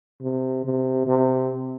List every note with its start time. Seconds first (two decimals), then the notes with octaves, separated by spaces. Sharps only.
0.22 C3
0.65 C3
1.07 C3